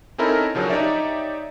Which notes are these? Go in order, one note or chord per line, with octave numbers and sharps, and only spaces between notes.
C4 C#4 D#4 E4 A4 A#4
C#3 F3 F#3 D4 A#4
D#4 G4 C#5 D5 E5